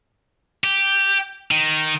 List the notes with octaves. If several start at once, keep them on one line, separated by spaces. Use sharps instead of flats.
G4
D#3